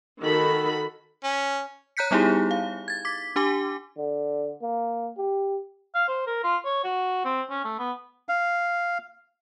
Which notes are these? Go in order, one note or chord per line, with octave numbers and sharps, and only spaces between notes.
D#3 F#4 A4 B5
C#4
C#5 A#5 F#6 G6 B6 C#7
G3 B3 D#4 E4 G4 G#4
F5
G#6 A6
D6 B6
D4 G4 G#5 D6
D3
A#3
G4
F5
C5
A#4
F4
C#5
F#4
C4
C#4
A3
B3
F5